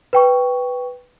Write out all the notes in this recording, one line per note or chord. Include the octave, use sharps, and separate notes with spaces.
B4 G5 C#6